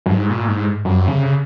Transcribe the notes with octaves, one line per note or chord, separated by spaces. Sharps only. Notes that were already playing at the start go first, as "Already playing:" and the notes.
F#2
G#2
A#2
G#2
F#2
C#3